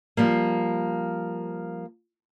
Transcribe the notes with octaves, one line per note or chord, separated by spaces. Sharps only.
F3 G3 A#3